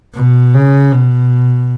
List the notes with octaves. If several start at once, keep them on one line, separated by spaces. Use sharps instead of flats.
B2
C#3
B2